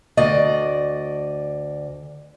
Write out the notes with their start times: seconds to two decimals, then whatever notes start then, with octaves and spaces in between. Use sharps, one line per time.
0.17 D2 D5 D#5